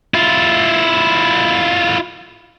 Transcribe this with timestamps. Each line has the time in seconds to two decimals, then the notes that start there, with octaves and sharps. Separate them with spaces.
0.14 E4 F4